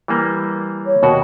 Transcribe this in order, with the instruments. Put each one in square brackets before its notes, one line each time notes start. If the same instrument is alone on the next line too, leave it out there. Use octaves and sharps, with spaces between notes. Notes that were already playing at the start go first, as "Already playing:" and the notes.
[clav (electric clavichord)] E3 G3 A#3
[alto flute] C#5
[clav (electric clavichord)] D#2 B2 F#4